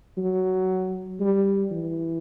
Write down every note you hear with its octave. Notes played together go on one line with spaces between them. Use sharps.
F#3
G3
E3